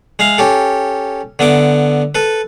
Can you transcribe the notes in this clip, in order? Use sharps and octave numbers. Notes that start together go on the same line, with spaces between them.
G#3 E5 F5
C#4 G4 A4
D3 B3 E5 D6
A4 B4